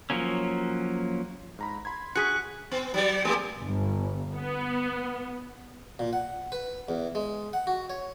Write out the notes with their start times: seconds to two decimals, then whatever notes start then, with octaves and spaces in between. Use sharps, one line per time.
0.10 F3 F#3 A#3 C#4
1.59 G#2 A#5 B5
1.85 B5 C6 G#6
2.15 F#4 G#4 F#6 B6 C#7
2.71 B3
2.94 F#3 G3 D5
3.25 G#3 A#3 G4
3.59 G1
4.36 B3
5.99 A#2
6.13 F#5
6.52 B4
6.89 E2
7.15 G#3
7.53 F#5
7.67 F#4
7.90 C#5